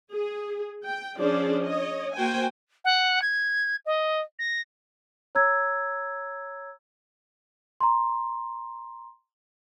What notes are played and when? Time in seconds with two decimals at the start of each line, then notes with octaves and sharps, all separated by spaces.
0.13 G#4
0.85 G5
1.17 F3 C#4 D4 G#4 C5 D5
1.65 C#5 D#5
2.15 A#3 F#4 C5 G5 G#5
2.84 F#5
3.22 G#6
3.86 D#5
4.39 A#6
5.35 C#5 A#5 E6 G#6
7.81 A#5 C6